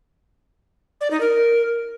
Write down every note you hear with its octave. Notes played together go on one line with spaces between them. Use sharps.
D5
D#4
A#4